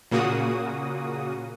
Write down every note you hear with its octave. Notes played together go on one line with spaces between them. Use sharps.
A#2 C#3 A#3 F#4 D#6